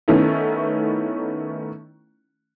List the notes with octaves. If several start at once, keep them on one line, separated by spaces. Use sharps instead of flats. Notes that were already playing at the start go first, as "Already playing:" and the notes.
D#3 A3 B3 C#4 D#4 E4